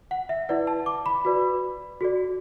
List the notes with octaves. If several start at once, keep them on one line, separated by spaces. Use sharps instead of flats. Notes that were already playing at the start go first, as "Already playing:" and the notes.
F#5
E5
E4 B4 D5 F#5
A5
D6
B5
F#4 B4 D5
F#4 A4 D5